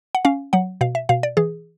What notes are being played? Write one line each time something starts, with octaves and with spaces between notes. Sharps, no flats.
F#5
C#4 F5
F#3 F#5
B2 F5
E5
B2 F5
D5
E3 G#4